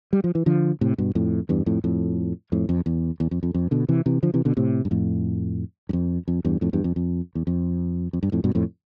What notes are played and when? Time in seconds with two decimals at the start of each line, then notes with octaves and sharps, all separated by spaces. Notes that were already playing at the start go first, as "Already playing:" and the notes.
0.13 G3
0.24 F3
0.35 E3
0.46 D3 F3
0.81 A2 C3
0.98 G2 B2
1.15 F2 A2
1.49 E2 G2
1.66 F2 A2
1.84 F2 A2
2.52 F2 A2
2.69 F2
2.86 E2
3.20 E2
3.31 F2
3.43 F2
3.54 F2
3.71 B2 D3
3.89 C3 E3
4.06 C3 E3
4.23 D3 F3
4.34 C3 E3
4.45 B2 D3
4.57 A2 C3
4.85 G2
4.91 F2 A2
5.89 G2
5.93 F2
6.28 F2
6.45 E2 G2
6.61 F2 A2
6.73 E2 G2
6.84 F2
6.96 F2
7.35 E2
7.47 F2
8.13 F2
8.23 G2
8.32 F2 A2
8.44 G2 B2
8.55 F2 A2